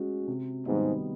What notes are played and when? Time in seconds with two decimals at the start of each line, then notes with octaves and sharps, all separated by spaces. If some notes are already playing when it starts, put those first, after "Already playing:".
Already playing: G#3 C#4 F#4
0.27 C3
0.66 G#2 D#3 G3 B3 D#4